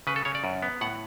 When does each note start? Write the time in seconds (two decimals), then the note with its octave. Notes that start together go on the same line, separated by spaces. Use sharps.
0.07 C#3 B4
0.16 A4
0.25 C#3 C#5
0.35 D5
0.44 F#2
0.62 B3
0.81 A2 F#5